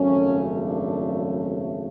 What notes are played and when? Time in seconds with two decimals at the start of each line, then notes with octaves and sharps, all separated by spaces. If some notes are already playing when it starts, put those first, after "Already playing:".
Already playing: G#1 F#2 C#3 F3 A3 C#4
0.62 D4